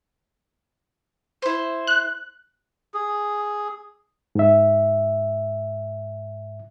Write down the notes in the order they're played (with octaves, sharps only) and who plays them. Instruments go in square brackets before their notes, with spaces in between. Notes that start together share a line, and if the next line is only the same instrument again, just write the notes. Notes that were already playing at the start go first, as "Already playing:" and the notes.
[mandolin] E4 C5
[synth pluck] F#6
[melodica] G#4
[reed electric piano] G#2 E5